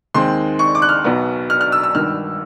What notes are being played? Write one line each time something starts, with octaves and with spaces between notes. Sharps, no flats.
D#2 D#3 G#3 C4 C6
C#6
D6
F#6
F6
B1 B2 F#3 B3
F6
F6
E6
E6
G#1 G2 D#3 F6